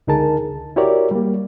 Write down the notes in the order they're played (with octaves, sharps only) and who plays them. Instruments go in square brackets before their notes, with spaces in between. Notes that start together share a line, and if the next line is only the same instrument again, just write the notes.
[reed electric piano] C#2 D3 D#4 G#4 A#4 A5
C#2
E4 F#4 G4 A#4 C#5 D5
G3 A#3